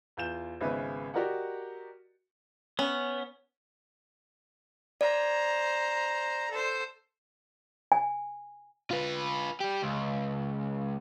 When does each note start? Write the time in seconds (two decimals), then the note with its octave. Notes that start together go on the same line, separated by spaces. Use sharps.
0.17 E2 F4 G6 E7
0.61 G#1 C#3 B3 B4 E5
1.14 F#4 G4 A#4 D5 D#5 F#5
2.79 B3 C#4
5.01 C5 D5 A#5
6.51 A4 C5
7.92 G#5
8.91 F4 B4
9.60 G3 G4
9.82 C#2